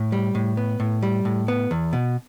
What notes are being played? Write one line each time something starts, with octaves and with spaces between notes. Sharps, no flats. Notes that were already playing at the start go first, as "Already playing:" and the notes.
Already playing: A2
G3
A2
B3
A2
G3
A2
B3
E2
B2